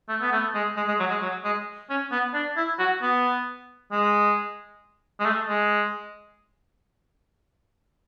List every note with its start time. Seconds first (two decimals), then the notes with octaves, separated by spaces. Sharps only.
0.09 A3
0.21 B3
0.32 A3
0.55 G#3
0.77 G#3
0.88 G#3
0.99 F#3
1.10 G#3
1.22 F#3
1.44 G#3
1.90 C#4
2.12 B3
2.34 D4
2.57 E4
2.79 F#4
3.02 B3
3.92 G#3
5.20 G#3
5.26 A3
5.48 G#3